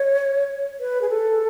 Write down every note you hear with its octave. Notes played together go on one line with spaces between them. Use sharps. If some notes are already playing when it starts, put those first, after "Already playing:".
Already playing: C#5
B4
G#4
A4